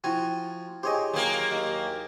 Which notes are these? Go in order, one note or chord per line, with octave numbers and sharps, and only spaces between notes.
F3 E4 F#4 G5 G#5
G4 G#4 C5 C#5 D#5
F#3 A#3
D#2